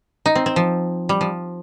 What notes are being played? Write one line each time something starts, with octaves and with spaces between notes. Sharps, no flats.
D#4
C4
C4
F3
G3
F3